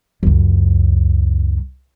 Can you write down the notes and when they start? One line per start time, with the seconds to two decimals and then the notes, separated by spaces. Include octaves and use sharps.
0.23 C#2 F#2